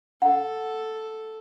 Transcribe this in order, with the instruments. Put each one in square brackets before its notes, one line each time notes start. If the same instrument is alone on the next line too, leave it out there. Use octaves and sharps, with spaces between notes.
[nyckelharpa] A4 [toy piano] F#5